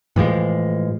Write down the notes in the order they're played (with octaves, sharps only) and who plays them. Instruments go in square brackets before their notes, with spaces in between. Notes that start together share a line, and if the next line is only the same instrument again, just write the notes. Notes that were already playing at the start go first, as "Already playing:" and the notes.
[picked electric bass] A2 E3 F3 G#3